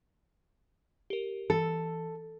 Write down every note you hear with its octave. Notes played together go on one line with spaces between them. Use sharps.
G4 A#4
E3 A4